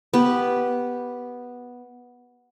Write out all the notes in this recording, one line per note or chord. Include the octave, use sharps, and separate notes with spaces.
B3 G4